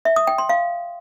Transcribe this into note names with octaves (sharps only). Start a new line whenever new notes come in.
E5
D#6
G5
C6
F5